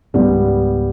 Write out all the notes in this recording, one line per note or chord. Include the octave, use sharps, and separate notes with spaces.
C#2 G#2 G3 B3